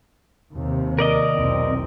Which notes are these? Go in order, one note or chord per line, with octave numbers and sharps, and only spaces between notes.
D#2 C3
A#4 D5 D#5
B1 E2 C4